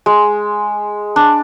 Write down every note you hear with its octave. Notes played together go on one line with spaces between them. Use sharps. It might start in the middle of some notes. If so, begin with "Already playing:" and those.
G#3
D4